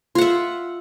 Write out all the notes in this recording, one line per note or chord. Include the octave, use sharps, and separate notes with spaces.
F4 E5 F#5